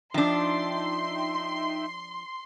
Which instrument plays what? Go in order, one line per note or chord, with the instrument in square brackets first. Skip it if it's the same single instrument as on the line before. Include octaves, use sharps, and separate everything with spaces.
[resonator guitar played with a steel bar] F3 D4 [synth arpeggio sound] D#4 E5 G5 [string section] C6